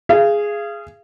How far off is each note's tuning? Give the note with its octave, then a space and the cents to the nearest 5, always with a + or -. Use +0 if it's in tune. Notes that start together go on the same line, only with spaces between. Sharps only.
G#4 +0 F5 -30